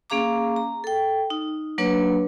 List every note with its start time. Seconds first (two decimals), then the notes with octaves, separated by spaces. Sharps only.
0.10 A#3 C#4 G#4 F5 A#5 D6
0.56 A#5
0.84 A4 G5
1.30 D#4
1.78 F#3 A#3 D4 B4 C#5